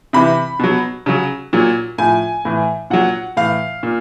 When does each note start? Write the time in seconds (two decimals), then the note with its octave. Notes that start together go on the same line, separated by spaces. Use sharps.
0.13 C3 E3 B5
0.59 B2 F#3
1.06 C#3 F#3
1.53 A#2 F#3
1.98 A2 F3 G#5
2.45 A2 E3
2.90 A#2 F#3 F#5
3.37 A2 E3 F5
3.83 A#2